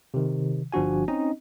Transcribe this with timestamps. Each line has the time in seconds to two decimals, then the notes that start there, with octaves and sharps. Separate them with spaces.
0.14 C3 D#3
0.72 G1 F3 D4 F#4 G#5
1.08 C4 C#4 D#4 D#5